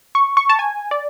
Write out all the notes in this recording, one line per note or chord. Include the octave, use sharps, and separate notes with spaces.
C#6
C#6
A5
G#5
D5